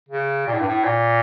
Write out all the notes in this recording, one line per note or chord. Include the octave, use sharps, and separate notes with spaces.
C#3
A#2
A2
G2
A2
A#2